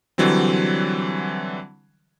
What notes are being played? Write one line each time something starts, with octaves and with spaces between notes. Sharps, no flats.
D3 E3 F#3 G3 C4